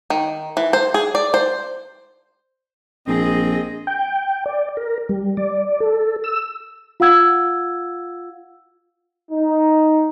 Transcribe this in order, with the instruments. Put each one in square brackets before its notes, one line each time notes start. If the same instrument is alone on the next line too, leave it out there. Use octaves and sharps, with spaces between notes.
[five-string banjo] D#3
E3
C5
G#4
D5
C5
[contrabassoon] A#1 [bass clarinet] C4 [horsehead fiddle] G#4 D#5
[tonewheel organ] G5
D5
A#4
G3
D5
A4
E6
[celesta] F4 F5 F#5 E6 G#6
[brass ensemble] D#4